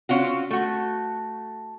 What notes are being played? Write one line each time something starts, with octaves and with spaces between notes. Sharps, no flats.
C4 C#4 F4 F#4
A3 F#4